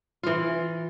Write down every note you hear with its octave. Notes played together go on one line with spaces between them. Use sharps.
E3 F4